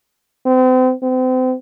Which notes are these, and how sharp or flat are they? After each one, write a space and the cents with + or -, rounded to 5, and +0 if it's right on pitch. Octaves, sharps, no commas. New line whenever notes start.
C4 -35
C4 -35